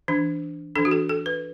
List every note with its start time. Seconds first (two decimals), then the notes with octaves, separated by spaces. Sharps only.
0.08 E3 D4
0.76 E3 D4 A4
0.85 F#4
0.91 A4
1.09 A4
1.26 B4